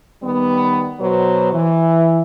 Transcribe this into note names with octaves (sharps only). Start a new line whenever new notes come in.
D#3 G3 B3
B2 F#3 B4 C5
E3